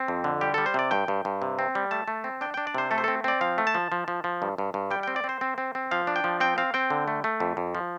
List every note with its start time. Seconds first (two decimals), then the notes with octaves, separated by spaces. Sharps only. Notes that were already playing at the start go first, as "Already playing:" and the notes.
Already playing: C4
0.08 F2
0.24 D3
0.41 G3 G4
0.54 G3 A4
0.66 C5
0.74 C3 D5
0.91 G2 G5
1.08 G2
1.25 G2
1.42 C3
1.59 C4
1.75 G3
1.91 A3 A5
2.08 A3
2.24 C4
2.41 D4 G5
2.54 D4 G5
2.67 D5
2.74 C3 C5
2.91 A3 A4
2.98 C5
3.04 C4 A4
3.24 C4 D5
3.41 F3 F5
3.58 A3
3.67 A5
3.75 F3
3.92 F3
4.08 F3
4.24 F3
4.42 G2
4.58 G2
4.74 G2
4.91 G3 G5
5.03 C4 G5
5.16 D5
5.24 C4
5.29 C5
5.41 C4
5.58 C4
5.75 C4
5.91 F3 F5
6.07 D4
6.16 G5
6.24 F3
6.40 C4 G5
6.58 C4 F5
6.74 C4 G5
6.90 D3
7.08 A3
7.24 A3
7.40 F2
7.57 F2
7.75 F3